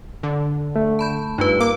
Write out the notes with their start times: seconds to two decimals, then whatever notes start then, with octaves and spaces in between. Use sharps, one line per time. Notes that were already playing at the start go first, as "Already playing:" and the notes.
0.23 D3
0.76 A3
0.99 A5 B5 G6
1.38 G2 D#4 F4 B4
1.60 A#3 D6 E6